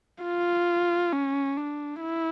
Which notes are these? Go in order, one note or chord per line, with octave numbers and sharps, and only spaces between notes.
F4
C#4
D4
E4